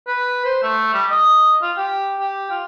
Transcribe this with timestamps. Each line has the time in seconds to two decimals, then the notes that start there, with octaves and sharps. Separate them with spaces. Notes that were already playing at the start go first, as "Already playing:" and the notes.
0.07 B4
0.45 C5
0.63 A3
0.93 G3
1.11 D#5
1.62 F4
1.77 G4
2.20 G4
2.51 F4